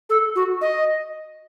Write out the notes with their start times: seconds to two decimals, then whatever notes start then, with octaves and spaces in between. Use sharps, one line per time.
0.09 A4
0.35 F#4
0.61 D#5